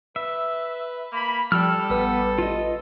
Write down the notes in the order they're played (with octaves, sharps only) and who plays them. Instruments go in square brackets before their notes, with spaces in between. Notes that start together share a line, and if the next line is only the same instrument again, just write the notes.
[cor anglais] B4 [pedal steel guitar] E5
[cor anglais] A#3 [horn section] B5
[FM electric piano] F3 [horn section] G3 [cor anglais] A4 [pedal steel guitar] G5 E6 F6
[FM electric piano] A1 B4 [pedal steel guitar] B3
[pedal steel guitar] F4 D#5